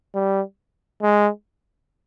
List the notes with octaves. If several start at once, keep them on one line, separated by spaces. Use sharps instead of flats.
G3
G#3